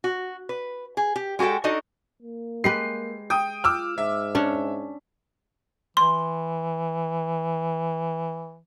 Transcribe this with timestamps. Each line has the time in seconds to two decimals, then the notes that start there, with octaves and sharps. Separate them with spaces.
0.04 F#4
0.49 B4
0.97 G#4
1.16 G4
1.39 G#3 F#4 G4 A4 G5
1.64 D4 D#4 F#4 A4 D#5
2.23 A#3
2.64 G#3 G4 B4 C7
3.30 G5 D#6
3.64 F4 D6 E6 F6
3.98 G#2 E5
4.35 C#4 D4 C#5
5.97 E3 C6